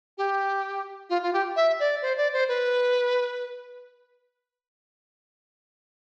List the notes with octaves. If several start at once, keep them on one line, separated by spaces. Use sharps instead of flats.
G4
F4
F4
G4
E5
D5
C5
D5
C5
B4